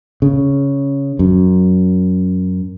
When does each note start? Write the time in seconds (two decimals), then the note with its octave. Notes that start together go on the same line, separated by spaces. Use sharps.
0.22 C#3
1.19 F#2